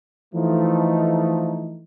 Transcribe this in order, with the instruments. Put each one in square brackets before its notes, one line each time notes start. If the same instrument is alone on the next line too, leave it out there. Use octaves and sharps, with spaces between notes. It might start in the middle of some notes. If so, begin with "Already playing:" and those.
[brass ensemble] E3 F3 A3 D#4